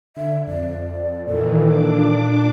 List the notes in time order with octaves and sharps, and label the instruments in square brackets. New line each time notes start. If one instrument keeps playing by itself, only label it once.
[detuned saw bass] D3 [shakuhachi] E5
[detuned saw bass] F2 [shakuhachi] D5
[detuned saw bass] A#2 [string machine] D#3 E3 [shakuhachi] A4
[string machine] D4 D6